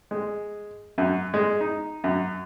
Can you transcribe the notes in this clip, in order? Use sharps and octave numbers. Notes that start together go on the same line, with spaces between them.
G#3
F#2
G#3
D#4
F#2